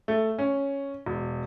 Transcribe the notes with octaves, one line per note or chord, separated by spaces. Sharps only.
A3
C#4
E1